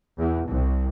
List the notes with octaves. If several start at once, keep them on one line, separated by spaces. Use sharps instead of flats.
E2
C2